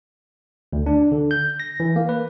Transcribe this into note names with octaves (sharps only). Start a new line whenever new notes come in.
D2
D4
D3
G6
A#6
E3
A#3
B4